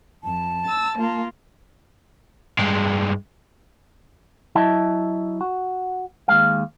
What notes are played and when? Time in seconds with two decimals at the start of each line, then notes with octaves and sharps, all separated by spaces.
0.24 F2 A5
0.65 E6 A6
0.98 A#3 F4
2.59 G2 G#3
4.55 F#3 E4 D#5 E5 A5
5.41 F#4
6.28 D#2 F#3 G#3 F5